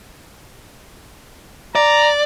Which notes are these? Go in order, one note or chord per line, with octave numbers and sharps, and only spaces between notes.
D5 A#5